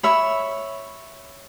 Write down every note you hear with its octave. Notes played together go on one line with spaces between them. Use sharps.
C#5 E5 B5